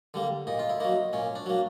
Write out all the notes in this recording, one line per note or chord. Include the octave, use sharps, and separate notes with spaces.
D3 G3 A#3
A#2 D#4
F4
E4
F#3 A#3 D#4
A#2 C#4
D4
F#3 A#3